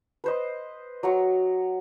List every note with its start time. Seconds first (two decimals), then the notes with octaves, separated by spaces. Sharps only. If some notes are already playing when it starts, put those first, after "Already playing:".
0.24 B4 C5 D#5
1.03 F#3 A#5 C#6